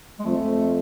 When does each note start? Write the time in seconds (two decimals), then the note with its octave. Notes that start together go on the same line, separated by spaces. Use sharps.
0.19 G#3
0.25 F2 A3